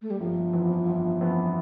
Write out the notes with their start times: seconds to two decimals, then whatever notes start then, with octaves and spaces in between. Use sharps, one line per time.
0.02 A3
0.11 G3
0.20 G1 F3
0.53 F2 E3 B3
0.87 G1
1.21 F2 E3 B3